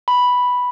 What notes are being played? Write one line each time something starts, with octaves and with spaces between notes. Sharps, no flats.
B5